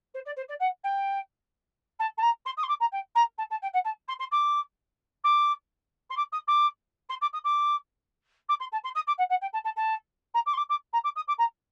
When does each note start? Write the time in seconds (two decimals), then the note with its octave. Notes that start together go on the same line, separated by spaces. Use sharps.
0.14 C5
0.25 D5
0.36 C5
0.48 D5
0.60 F#5
0.84 G5
1.99 A5
2.17 A5
2.22 A#5
2.45 C6
2.57 D#6
2.63 C6
2.68 D6
2.80 A#5
2.92 G5
3.15 A#5
3.38 A5
3.50 A5
3.62 G5
3.73 F#5
3.84 A5
4.08 C6
4.19 C6
4.31 D6
5.24 D6
6.10 C6
6.17 D6
6.32 D#6
6.47 D6
7.09 C6
7.21 D6
7.33 D#6
7.44 D6
8.49 D6
8.60 C6
8.72 A5
8.84 C6
8.95 D#6
9.07 D6
9.18 F#5
9.30 F#5
9.41 G5
9.53 A5
9.64 A5
9.76 A5
10.34 A#5
10.46 D6
10.53 C6
10.57 D6
10.69 D6
10.93 A#5
11.04 D6
11.16 D#6
11.28 D6
11.38 A#5